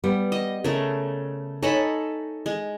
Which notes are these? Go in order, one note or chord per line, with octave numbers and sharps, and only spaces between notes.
G3 B3
D#5
C#3 A3 A#4
D#4 A4 C#5 G#5 B5
G#3